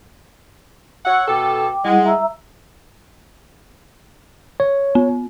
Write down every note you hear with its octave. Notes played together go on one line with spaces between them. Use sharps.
C#5 F#5 E6
B2 A4 G5 D6
G3 G#3 E4 F#5
E5 A#5 E6
C#5
B3